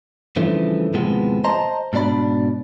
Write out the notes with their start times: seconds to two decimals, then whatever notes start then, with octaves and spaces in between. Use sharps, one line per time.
0.36 G2 C#3 E3 F3 A3
0.94 D#2 A2 C3 F3 G#3 B3
1.44 C5 D#5 A5 A#5 C6
1.93 G#2 B2 D4 D5 B5